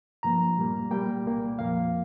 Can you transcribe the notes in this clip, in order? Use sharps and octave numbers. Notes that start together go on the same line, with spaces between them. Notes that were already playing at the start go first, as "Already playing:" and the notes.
G2 F3 A#3 A#5
A#2 G3 A#3
A#2 G3 A#3 G5
C2 A#2 A#3
F2 F3 A#3 F5